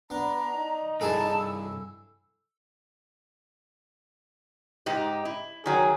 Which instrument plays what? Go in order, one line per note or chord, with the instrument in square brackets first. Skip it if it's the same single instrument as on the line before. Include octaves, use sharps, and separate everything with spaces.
[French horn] B3 [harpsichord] D4 [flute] A#5
[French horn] D#4
[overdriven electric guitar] C2 G2 [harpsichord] E4 G#4 A4 [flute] A5
[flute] E6
[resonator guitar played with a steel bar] G#2 D#4 G4
E4
[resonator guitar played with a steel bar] D#3 F#3 [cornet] G#4